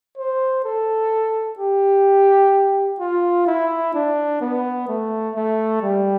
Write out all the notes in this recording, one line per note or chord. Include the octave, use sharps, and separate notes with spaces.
C5
A4
G4
F4
E4
D4
B3
A3
A3
G3